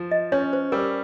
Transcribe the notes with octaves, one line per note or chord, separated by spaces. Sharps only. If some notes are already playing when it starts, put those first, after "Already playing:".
Already playing: F3
D#5
C#4 C#5
C5
G3 A#4